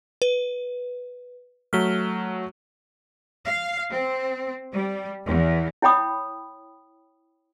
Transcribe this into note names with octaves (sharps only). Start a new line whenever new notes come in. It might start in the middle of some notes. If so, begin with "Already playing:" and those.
B4
F#3 A3 F6 B6 G7
F5
C4
G3
E2
E4 C#5 G5 B5 D#6